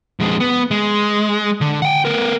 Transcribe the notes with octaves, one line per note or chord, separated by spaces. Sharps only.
F2 G#3
B3
G#3
D3
F#5 G5
B3 A#4